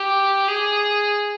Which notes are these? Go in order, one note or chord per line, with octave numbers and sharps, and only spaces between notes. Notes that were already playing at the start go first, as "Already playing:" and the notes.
Already playing: G4
G#4